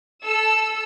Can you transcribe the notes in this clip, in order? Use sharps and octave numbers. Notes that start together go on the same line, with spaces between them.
A4 E6